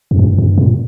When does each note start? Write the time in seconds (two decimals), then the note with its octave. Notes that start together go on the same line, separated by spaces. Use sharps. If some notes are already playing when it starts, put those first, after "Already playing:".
0.11 F2
0.19 G2
0.38 G2
0.58 A#2